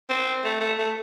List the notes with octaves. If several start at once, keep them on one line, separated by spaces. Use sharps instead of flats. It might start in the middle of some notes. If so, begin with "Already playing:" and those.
C4
A3
A3
A3